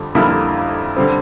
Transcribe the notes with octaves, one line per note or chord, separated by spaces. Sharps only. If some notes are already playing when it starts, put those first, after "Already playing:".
Already playing: F2 D3 G3
F2 D3 G3 A#3 E4
D3 G3 C4